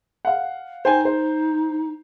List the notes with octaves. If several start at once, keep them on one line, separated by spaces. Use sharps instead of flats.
F5 F#5
D#4 C5 G5 G#5
C5